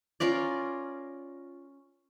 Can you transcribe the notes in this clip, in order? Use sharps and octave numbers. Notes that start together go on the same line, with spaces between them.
C#4 F4 A#4 D5